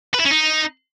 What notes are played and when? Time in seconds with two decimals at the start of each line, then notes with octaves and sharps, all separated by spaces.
0.14 B4
0.20 E4
0.25 C#4
0.31 D#4